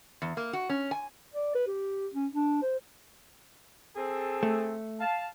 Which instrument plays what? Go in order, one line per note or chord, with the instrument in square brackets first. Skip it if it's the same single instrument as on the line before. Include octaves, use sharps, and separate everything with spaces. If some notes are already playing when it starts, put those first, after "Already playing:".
[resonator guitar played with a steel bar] E2
A#3
F#4
C#4
G#5
[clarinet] D5
B4
G4
C#4
D4
C5
[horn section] C4 G#4 A4
[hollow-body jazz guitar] A3
[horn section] F5 A5